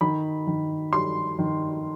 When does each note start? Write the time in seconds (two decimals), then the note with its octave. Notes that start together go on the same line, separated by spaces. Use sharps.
0.01 D#3 B5
0.47 D#3
0.93 G3 C6
1.39 D#3